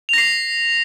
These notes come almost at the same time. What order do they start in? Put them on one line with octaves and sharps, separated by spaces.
F7 A#6 C7